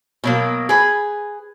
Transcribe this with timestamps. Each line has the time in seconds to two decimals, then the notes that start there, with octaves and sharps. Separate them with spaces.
0.24 B2 F#3 A#3
0.69 G#4 B4